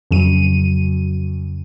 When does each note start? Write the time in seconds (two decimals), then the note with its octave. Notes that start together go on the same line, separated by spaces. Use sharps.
0.11 F2 C#3 F#3 D#7